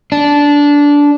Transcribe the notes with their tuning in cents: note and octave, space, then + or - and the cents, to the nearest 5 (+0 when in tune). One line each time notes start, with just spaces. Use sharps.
D4 -15